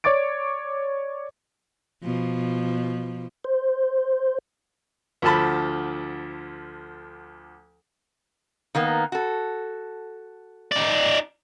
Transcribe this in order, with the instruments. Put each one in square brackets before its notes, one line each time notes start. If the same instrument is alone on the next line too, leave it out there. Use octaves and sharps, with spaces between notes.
[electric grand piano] C#5 D5 D6 A6 D7
[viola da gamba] B2 F3
[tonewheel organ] C5
[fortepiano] D2 D3 F3 A4 A5 B5
[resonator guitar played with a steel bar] D#3 A#3 B3
F#4 A4
[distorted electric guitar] D#4 D5